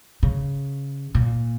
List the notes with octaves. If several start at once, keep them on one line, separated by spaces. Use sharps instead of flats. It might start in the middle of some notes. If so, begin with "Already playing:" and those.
C#3
A#2